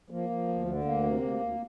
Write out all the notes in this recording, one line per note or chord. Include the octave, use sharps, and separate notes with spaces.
F3 A#3
F3
D2
D3
D2 A#3
C3
D2
D2